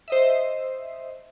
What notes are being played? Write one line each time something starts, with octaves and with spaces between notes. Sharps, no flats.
C5 D#5 E5